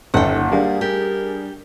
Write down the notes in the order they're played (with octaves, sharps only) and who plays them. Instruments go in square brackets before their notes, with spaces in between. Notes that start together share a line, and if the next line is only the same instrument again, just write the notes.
[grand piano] G1 [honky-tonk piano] D#2 C#4 [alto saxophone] A4 [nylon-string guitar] F#5 G5
[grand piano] G3 [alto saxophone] A#3 [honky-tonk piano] D4 G#4
[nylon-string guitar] G4 [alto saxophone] A#4